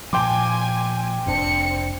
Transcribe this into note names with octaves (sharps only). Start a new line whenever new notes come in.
A#2 F3 G5 G#5 C6 D6
F1 C4 D4 C#7